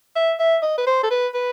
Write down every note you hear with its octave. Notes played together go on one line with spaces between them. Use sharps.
E5
E5
D#5
B4
C5
A4
B4
B4